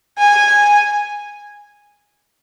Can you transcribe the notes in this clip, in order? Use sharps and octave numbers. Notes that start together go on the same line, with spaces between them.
G#5